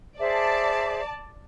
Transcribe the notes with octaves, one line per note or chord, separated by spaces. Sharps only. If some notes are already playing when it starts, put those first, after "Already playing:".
G#4 C5 D5 E5 A5